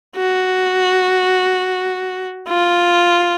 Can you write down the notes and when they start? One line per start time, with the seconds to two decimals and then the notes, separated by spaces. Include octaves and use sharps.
0.16 F#4
2.49 F4